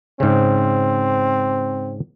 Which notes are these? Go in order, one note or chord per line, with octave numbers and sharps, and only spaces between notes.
G#2 C#3 C4